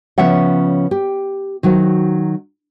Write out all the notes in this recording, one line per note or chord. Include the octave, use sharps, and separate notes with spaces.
C#3 F3 B3 C#4 E5 F#5
G4
D#3 F#3 F#4 C5